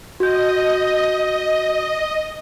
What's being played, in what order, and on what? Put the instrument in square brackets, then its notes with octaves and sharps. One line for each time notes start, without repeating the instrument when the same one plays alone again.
[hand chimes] F#4 G6 [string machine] D#5